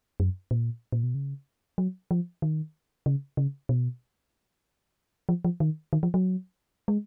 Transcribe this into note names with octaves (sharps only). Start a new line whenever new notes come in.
F#2
A#2
A#2
B2
C#3
F#3
F3
D#3
C#3
C#3
B2
F3
F3
D#3
D#3
F3
F#3
G#3